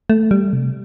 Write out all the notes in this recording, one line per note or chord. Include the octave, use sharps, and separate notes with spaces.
A3
G3
C3